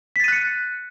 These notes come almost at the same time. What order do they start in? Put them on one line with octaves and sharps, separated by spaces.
B6 A6 D#7 F#6 C#7